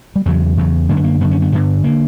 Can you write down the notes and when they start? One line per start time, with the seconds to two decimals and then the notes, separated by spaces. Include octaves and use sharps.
0.16 G3
0.26 E2 C#3 F#3
0.58 E2 C#3
0.89 F#2 D3 A#3
0.97 B3
1.04 A#3
1.21 F#2 B3
1.25 D3
1.31 C#4
1.42 B3
1.52 G2 D3 B3
1.84 D3 A#3